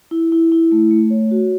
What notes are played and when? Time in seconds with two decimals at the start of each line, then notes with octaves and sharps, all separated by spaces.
0.11 E4
0.32 E4
0.52 E4
0.72 A3
0.91 A3
1.10 C#5
1.31 F#4